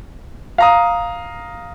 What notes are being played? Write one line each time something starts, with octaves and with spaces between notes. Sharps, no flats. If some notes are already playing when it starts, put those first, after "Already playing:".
F5 A#5 D#6